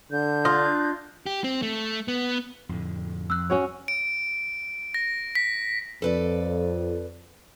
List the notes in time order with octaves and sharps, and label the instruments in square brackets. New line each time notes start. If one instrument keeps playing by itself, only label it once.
[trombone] D3 [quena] G6
[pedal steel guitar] D4 D#5 [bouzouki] F4
[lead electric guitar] G4
C4
A3
B3
[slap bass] F2 A2 D3
[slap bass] F2 [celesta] E6 F#6
[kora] C#4 F#4 C#5
[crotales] D7
A#6
B6
[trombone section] F2 [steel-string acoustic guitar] A4 B4 D5